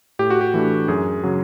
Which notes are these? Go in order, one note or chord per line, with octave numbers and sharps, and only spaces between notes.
A2 G4
F#4
G4
E3 A3 D4
F#2 G#4
C#3 F#3